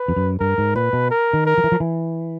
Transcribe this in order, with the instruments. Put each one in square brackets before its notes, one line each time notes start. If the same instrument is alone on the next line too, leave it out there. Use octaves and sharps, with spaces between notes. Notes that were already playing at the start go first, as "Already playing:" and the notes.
Already playing: [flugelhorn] B4
[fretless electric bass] F2
F#2
[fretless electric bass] G2 [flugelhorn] A#4
[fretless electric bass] G#2
[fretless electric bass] A#2 [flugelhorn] B4
[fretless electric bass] B2
[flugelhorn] A#4
[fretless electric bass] D#3
[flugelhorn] A#4
[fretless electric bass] F3
E3
F3
E3